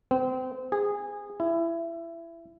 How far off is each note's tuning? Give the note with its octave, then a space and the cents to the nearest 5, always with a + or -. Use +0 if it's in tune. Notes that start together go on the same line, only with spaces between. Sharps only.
C4 -30
G#4 -20
E4 +20